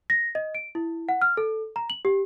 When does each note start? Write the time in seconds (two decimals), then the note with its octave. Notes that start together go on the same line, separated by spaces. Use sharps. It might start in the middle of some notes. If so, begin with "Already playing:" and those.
0.10 A#6
0.35 D#5
0.55 D7
0.75 E4
1.09 F#5
1.21 F6
1.37 A4
1.76 A#5
1.90 F#7
2.05 G4